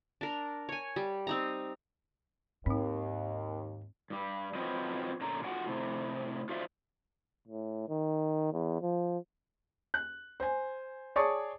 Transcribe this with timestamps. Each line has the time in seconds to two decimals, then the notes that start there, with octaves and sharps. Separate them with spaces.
0.21 D4 A#4
0.69 C#5 G#5
0.96 G3
1.27 C4 D#4 A#5
2.66 D#2 G#2 C4 D#4
4.10 G2 G3
4.55 F#3 C4 F4 B4 C5 D#5
5.21 A#2 D3 C#4 A#5
5.44 F4 F#4 F#5 G#5
5.66 A2 C3
6.49 F4 F#4 C5 D5 E5 F5
7.48 A2
7.89 D#3
8.52 E2
8.82 F3
9.94 F#6
10.40 C5 G#5
11.16 G#4 C#5 D5 A5 C#6 D#6